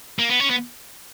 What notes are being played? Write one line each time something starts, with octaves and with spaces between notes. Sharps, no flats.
A#3
B3
C#4
B3